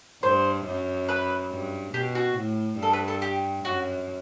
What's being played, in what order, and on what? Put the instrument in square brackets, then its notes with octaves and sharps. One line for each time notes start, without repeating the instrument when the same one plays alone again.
[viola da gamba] G2 [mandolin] C5
[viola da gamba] F#2
[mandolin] B4
[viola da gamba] G2
[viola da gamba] B2 [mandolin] G4
[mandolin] F#4
[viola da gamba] A2
[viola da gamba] G2 [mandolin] A4
[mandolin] B4
A4
G4
[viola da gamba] F#2 [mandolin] F#4